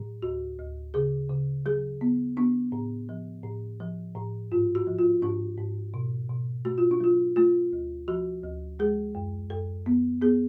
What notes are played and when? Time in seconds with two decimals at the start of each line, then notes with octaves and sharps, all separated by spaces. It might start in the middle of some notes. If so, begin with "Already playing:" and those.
Already playing: A2 F#3
0.22 D2 F#4
0.59 D2
0.94 C#3 G#4
1.30 C#3
1.66 F#3 G#4
2.01 B3
2.37 B3 D4
2.72 A2
3.09 F3
3.44 A2
3.80 F3
4.15 A2
4.52 G#2 F4
4.75 F#4
4.87 F3
4.98 F4
5.22 G#2 D4
5.58 G#2
5.94 B2
6.30 B2
6.65 A3 F#4
6.78 F4
6.91 D4
7.00 F#3 F4
7.36 A3 F4
7.73 D2
8.08 F3 F#4
8.44 D2
8.79 G#3 G#4
9.15 F#2
9.50 F#2 A4
9.86 B3
10.22 B3 G#4